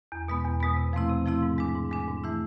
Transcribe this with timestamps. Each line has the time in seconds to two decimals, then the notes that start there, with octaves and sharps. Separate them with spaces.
0.12 E2
0.28 B2 G#3 B3
0.45 E2
0.60 B2 G#3 B3
0.77 C3
0.93 F3 A3 C4 E4
1.09 C3
1.26 F3 A3 C4 E4
1.42 G#2
1.58 G#3 D4
1.75 G#2
1.91 G#3 D4
2.08 G#2
2.24 E3 A3 E4